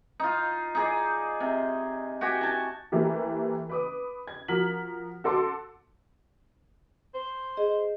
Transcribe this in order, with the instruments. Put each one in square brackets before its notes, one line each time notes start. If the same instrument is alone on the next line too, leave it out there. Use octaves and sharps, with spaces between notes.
[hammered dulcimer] D#4 F4
D#4 G#4 D5
C3
F#4 G4 G5 G#5
G#5 A5
[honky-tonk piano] E3 A3 A#3 G4
B4 D6 D#6
G#6
F3 F#4 A#4 F6 B6 F#7
F#4 A4 C6 D6
[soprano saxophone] C5
[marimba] G#4 D#5